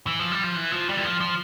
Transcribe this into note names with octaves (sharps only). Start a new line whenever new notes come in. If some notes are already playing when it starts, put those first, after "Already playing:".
E3
F3
G3
F3
E3
F3
G3
E3
F3
F3